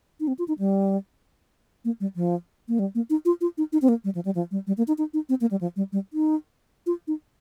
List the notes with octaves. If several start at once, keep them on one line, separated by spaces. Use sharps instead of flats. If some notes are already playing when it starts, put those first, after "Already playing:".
D#4
C4
F4
D#4
G3
A#3
G3
F3
A#3
G3
A#3
D#4
F4
F4
D#4
D#4
C4
A#3
G3
F3
G3
F3
G3
G3
A#3
D#4
D#4
D#4
C4
A#3
G3
F3
G3
G3
D#4
F4
D#4